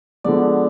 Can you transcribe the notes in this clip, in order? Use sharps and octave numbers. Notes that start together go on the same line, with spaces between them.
D3 F3 G#3 B3 D5